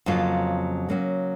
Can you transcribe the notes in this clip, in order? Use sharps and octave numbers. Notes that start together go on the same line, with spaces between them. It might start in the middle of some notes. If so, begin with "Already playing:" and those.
F2 C#3 F#3 A#3 F4
C#3 F#3 A#3 C#4 F#4